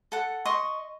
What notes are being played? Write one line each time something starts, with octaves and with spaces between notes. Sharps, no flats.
A4 F#5
D#5 C6 C#6